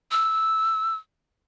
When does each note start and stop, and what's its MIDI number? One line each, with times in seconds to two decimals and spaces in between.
0.11 0.95 88